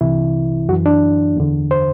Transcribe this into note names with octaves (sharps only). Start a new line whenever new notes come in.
C2 C3 E3 E4
F#2 E3 F#4
D4
E2 D3
C5